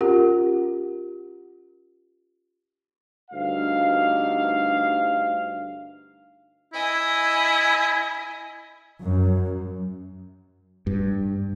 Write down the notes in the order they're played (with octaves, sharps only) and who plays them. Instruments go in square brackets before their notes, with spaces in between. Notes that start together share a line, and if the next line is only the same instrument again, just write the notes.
[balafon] C#4 F4 G4 A#4 F#5
[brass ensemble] D2 G2 D#4 F5
[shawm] E4 [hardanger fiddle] D#5 G#5
[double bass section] F#2
[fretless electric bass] G2